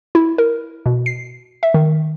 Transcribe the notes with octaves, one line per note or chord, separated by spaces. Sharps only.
E4
A#4
B2
C7
E5
D#3